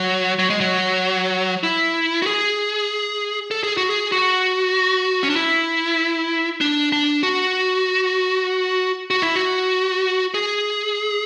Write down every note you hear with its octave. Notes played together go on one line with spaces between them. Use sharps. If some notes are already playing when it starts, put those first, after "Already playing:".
Already playing: F#3
F#3
G#3
F#3
E4
F#4
G#4
A4
G#4
F#4
G#4
F#4
C#4
D4
E4
D4
D4
F#4
F#4
E4
F#4
G#4